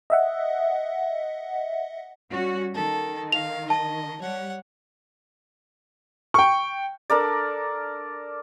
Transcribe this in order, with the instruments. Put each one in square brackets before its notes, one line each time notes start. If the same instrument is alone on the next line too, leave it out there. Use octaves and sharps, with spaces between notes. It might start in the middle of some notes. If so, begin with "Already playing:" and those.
[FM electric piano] D#5 E5 F#5
[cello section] G3 C#4 F#4
[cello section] D#3 [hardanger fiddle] A4
[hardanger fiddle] F5 [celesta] F7
[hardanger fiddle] D#5 [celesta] A5
[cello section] G3 [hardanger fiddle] C#5 F#5
[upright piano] G5 C#6
[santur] D4 A4 A#4 D5